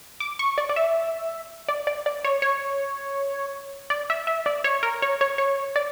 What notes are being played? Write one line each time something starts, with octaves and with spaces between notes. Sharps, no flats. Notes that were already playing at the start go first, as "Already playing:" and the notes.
D6
C#6
D5
D5
E5
D5
D5
D5
C#5
C#5
D5
E5
E5
D5
C#5
A#4
C#5
C#5
C#5
D5